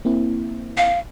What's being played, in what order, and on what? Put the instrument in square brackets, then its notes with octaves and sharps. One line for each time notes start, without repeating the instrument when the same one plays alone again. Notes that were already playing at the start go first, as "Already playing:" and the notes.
[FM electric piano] A#3 C4 E4
[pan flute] F5